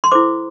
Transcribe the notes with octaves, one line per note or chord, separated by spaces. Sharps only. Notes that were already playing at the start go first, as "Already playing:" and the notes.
C6
E4 A4 C5 D6